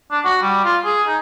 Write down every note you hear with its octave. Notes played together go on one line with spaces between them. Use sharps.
D4
F#4
G3
F4
G#4
D#4